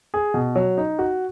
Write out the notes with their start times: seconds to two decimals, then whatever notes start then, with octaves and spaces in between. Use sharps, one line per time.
0.14 G#4
0.34 B2
0.55 F#3
0.77 D#4
0.99 F#4